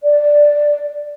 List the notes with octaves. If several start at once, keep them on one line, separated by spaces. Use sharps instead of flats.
D5